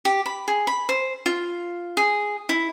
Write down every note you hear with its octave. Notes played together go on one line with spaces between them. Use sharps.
G4
B5
G#4
B5
C5
F4
G#4
E4